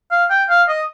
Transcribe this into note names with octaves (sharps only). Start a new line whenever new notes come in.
F5
G5
F5
D#5